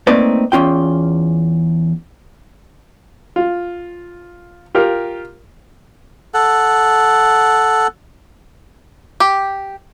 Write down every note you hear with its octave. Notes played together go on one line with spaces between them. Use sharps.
A3 A#3 C4 D#4 B4 D5
E2 C#4 F4 G5
F4
F4 G4 A#4 F6
A4 F#5
G4